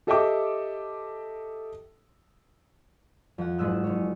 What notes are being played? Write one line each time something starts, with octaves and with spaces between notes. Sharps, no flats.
G4 A4 D#5 E5 G5 D6
F2 F#5
F#1 G#2 D#5 E6 F#6
F#1 C#5